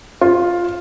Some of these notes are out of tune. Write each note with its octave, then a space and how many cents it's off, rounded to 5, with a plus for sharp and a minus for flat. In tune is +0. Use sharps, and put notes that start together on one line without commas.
F4 +5